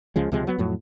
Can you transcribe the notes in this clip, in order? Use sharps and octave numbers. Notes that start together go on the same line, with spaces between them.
C#2 C#3 F3 G#3
C#2 C3 F3 G#3
F#3 B3
F2 A2 F#3